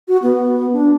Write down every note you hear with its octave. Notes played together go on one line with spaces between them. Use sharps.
F#4
B3
D4